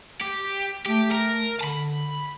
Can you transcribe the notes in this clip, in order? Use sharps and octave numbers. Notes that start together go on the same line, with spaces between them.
G4
A3 G4
A#4
D3 A5 B5